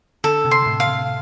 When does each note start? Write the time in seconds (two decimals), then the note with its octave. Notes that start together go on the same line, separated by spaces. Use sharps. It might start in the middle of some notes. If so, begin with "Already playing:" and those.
0.24 D3 A4
0.45 C3
0.51 C6
0.62 C3
0.66 A2
0.80 F5
0.87 C3